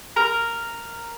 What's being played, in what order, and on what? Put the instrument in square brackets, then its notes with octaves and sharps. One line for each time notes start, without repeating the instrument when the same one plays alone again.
[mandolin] A#4